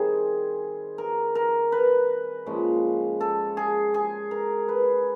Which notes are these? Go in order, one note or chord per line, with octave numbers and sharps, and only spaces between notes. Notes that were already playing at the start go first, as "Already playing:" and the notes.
Already playing: D#3 G3 C4 G#4
A#4
A#4
B4
A#2 F3 G#3 C#4
A4
G#4
G#4
A#4
B4